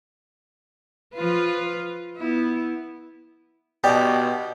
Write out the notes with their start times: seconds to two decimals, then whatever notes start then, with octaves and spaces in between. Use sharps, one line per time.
1.15 F3 F4 B4
2.17 B3 E4
3.84 B2 D#4 G4 D5